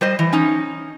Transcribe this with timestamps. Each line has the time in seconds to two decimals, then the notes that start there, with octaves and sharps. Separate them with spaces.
0.01 G3 C5 D#5
0.19 E3
0.33 C#4 D#4